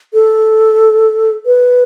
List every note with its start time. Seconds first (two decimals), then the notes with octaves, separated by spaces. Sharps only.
0.14 A4
1.46 B4